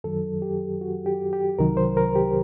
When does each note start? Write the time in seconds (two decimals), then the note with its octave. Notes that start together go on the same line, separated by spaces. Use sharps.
0.04 F#2 D#3 F#3 A4
0.42 G4
0.81 F#4
1.06 G4
1.33 G4
1.59 C2 C3 D#3 F#3 A#4
1.77 C5
1.97 A#4
2.15 G4